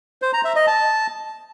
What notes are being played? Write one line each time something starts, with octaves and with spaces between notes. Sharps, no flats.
C5
A#5
E5
D#5
A5